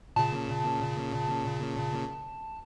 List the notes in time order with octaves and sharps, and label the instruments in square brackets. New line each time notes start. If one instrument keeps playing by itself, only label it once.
[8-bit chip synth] A#2 C#3 [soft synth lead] A5